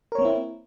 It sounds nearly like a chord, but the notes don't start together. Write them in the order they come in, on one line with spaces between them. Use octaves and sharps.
A#4 C#5 A#3 C4 E4